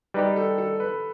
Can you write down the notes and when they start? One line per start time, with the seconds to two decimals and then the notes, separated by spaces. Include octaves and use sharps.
0.14 G3 D#4 G4 B4
0.36 A4
0.58 A4
0.80 B4